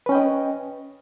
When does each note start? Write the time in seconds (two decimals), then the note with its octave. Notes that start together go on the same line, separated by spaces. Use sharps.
0.06 B4
0.09 C#4
0.12 G5
0.15 D#5